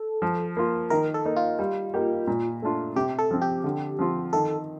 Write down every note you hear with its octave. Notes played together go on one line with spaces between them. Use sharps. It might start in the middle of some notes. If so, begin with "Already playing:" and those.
Already playing: A4
F3
A#3 F4
D#3 A#4
A4
A#3 D#4
F4
G3
A#3 D#4 G4
A#2
A3 D4 F4
C3 G4
A4
F3 C4
G4
D3
F3 C4 F4
D#3 A4